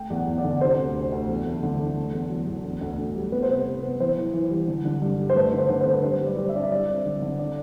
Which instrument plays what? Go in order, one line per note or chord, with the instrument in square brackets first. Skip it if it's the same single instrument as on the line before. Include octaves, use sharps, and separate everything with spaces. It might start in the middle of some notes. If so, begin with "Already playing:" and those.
Already playing: [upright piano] A3 G5
E2
F#5
E2
D5
D3
C3 C5
D2
C3
D2
E2
A3
D3
A3
A3
E2
F#3
E2
D2
D2
D2
G3
B3 B4
C5
C3 B4
C3
B3
E3 C5
E3
E3
G3
D3
D3
G2
G3
C5
A3 B4
D3
C5
D3
C5
D3
B4
G3 C5
G3
D5
G3
E5
D4 D5
E5
G3 D5
C4
D3
D3
D5